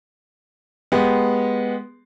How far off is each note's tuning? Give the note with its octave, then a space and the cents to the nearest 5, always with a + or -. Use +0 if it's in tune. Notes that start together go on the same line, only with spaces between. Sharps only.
G#3 +0 B3 -5 G4 +0